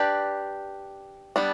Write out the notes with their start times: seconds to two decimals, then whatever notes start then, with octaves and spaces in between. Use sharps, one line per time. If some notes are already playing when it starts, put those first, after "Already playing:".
Already playing: D4 G4 B4 D5
1.36 G3 B3 D4